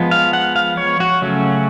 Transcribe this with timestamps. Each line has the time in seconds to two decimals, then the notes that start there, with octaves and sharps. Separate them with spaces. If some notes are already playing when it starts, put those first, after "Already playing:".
Already playing: F3 G#3 B3
0.11 F5
0.33 F#5
0.56 F5
0.77 C#5
1.00 F#4
1.22 C#3 F#3 A3 C#4